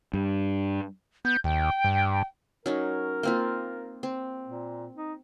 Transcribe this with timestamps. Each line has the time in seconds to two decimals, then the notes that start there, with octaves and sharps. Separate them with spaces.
0.14 G2
1.25 B3 G6
1.44 D#2 G5
1.84 G2
2.66 F#3 C#4 D#4 A#4
3.23 A#3 C4 F4
4.03 C4
4.47 A#2
4.96 D#4